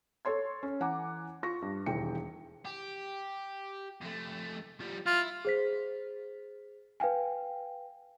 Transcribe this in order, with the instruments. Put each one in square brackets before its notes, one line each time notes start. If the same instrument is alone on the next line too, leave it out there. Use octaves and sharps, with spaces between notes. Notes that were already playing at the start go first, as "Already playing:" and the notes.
[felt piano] A4 C#5 C6 G#6
C#4
E3 F#5 G#5 A#5 D6
F4 C#6 A#6
G2
E1 D#2 E3 G5 C#7
[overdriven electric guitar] G4
F2 A3
F3 G3
[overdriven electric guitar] E4 [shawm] F4
[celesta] G#4 C5 B6
B4 F5 G5 G#5